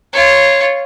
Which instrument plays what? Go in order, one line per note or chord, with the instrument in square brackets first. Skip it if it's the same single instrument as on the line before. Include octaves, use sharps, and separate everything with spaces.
[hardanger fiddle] F4 C#5